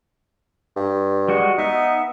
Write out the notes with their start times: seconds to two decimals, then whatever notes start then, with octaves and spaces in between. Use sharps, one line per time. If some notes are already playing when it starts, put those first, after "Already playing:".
0.76 G2
1.28 G3 G#3 F#4
1.58 B3 D#4 E5